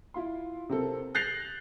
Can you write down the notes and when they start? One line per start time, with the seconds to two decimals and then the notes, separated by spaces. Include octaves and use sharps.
0.14 E4 F4 C6
0.69 C3 C4 A4 A#4
1.15 F#6 G6 A6 A#6 C7 F7